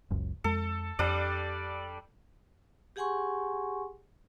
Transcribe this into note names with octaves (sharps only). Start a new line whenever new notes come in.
F#1 C#2 F#2
F2 G#3 A4
F2 G3 D4 D5
G4 G#4 F#5 G#5 C6 C#6